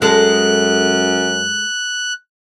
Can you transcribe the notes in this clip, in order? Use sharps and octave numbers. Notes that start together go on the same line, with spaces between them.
F#2 G#3 A4 F#6